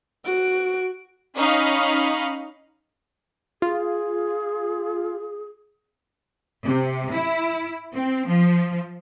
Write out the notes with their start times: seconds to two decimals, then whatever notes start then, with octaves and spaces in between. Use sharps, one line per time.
0.25 F#4 D7
1.36 C#4 D#4 D#5 F5 B5 C#7
3.62 F4 G#4
6.65 C3
7.13 E4
7.95 C4
8.28 F3